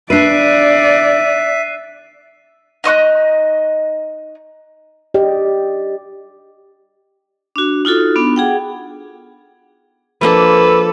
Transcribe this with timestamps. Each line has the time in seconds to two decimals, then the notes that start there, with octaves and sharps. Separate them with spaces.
0.10 D4 B4 D5 E5 F#6 C7 D#7
2.84 D#4 D#5 C#6 F#6
5.14 G4 D5 D#5
7.56 D4 F#4
7.85 D#4 F4 F#4 A4
8.16 B3 D4
8.36 G#4 F#5 G5
10.21 F3 A#3 D4 A4 B4